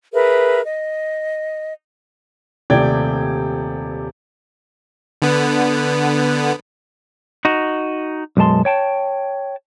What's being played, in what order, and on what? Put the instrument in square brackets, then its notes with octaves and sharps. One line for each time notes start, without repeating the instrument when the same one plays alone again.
[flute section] G#4 A#4 B4 E5
D#5
[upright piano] D#1 C3 A3 D5 G5 G#6
[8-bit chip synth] D3 B3
[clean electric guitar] D#4 F#4
B1 F#2 G#3 A5 C6
C#5 G5 A5